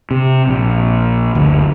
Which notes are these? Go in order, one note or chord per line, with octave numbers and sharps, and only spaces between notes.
C3
A#1
F#1 D2